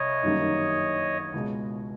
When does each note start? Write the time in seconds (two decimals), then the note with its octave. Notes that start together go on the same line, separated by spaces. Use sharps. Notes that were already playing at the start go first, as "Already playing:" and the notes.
Already playing: C2 C#5 D#5
0.23 G1 F#2 D#3 G3 A#3
1.33 C#2 B2 G#3